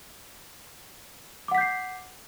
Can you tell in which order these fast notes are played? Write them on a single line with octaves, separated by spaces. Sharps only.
D6 F#5 B6 G6 C7